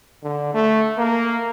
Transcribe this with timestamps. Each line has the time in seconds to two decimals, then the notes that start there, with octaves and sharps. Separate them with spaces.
0.23 D3
0.54 A3
0.98 A#3